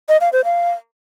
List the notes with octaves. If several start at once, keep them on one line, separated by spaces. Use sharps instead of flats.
D#5
F5
C5
F5